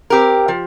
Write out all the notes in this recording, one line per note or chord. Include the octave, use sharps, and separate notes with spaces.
C4 G4 A#4
F3